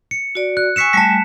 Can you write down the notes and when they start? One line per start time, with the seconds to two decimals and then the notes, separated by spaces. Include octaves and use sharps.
0.11 C#7
0.35 F#4 D5
0.57 F#6
0.76 G#5 C#6 E6 B6 C#7 E7
0.93 G3 A3 G#5 A5 B6